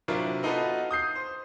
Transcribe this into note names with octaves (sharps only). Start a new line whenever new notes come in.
C3 F#3 D4 E4 F4 A#4
B3 D#4 F4 F#4 A4 B4
D#6 G6 C7
C5